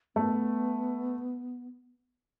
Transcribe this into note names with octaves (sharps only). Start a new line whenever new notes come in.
A3 B3